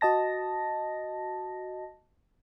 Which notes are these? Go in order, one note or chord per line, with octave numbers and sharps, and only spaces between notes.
F#4 D#5 A5 A#6